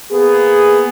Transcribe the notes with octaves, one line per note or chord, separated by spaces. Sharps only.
A#3 B3 G#4